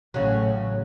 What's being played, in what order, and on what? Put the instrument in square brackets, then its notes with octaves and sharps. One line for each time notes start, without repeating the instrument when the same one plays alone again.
[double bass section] A1 A2 C#4 [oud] C#3 F#3